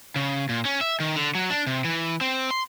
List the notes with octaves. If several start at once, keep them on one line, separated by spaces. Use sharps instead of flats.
C#3
A#2
C#4
E5
D#3
D3
F#3
D4
C3
E3
C4
C6